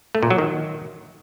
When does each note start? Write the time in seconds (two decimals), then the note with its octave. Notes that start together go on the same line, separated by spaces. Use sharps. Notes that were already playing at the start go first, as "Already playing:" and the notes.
0.15 A3
0.23 A#2
0.30 F#3
0.38 D#3